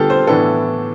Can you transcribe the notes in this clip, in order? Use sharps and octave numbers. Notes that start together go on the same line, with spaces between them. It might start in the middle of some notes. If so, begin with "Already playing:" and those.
Already playing: D3 G3 B3 F4 G4 A4
C5
A2 E3 B3 D4 A4